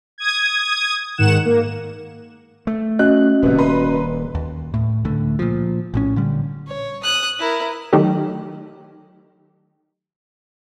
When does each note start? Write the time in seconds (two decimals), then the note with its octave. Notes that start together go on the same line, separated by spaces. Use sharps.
0.18 D#6 G#6
1.17 G#2 D#3 F#5 E7
1.45 A#3
2.67 A3
2.99 C#4 F#4 D#5 F#6
3.42 D#1 C3 B3
3.58 B4 A#5 C6
4.35 D#2
4.74 A2
5.05 C#2 A2 D3 A3
5.39 A#2 F3
5.94 A#1 A2 C#4
6.16 A#2 D3 G3
6.67 C#5
7.03 D#6 F#6
7.39 E4 A#4
7.93 D#3 F#3 A3 G4 A4